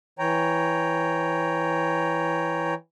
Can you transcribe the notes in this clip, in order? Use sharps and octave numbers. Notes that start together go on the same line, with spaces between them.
E3 C#5 G5 A#5